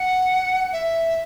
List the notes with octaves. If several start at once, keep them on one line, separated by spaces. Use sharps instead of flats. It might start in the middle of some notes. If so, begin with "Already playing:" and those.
Already playing: F#5
E5